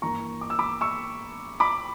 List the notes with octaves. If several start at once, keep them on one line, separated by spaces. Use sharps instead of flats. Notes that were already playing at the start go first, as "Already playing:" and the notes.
G2 E3 A#3 A#5 C#6
D6
E6
B5 D6
C#6 E6
B5 D6